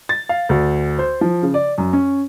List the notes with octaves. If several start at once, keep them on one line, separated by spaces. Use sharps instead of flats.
A6
F5
D2
C5
F3
C#3
D5
F#2
C#4